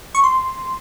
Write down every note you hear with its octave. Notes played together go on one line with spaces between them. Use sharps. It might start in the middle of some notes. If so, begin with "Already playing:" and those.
C#6
C6